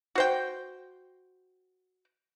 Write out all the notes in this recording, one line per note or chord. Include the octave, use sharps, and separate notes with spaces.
F#4 C5 G5